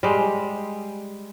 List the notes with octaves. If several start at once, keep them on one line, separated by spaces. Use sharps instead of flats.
G3 G#3